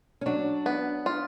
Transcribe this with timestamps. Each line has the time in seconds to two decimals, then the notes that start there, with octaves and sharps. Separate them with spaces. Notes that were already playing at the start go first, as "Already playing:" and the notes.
0.21 C#4
0.26 F#3 D4
0.66 B3
1.06 F4